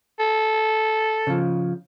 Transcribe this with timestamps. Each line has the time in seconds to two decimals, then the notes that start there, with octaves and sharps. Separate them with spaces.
0.20 A4
1.27 C#3 F3